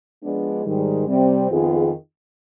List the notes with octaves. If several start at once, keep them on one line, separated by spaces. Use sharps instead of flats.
F3 G#3 B3 D4
G#2 D#3 G3
C3 G3 C4
F2 D#3 B3 F4 G#4